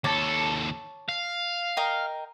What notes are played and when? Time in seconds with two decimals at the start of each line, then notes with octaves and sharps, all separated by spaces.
0.04 D#2 A4 C#5 A5 D6
1.09 F5
1.77 A#4 D#5 G5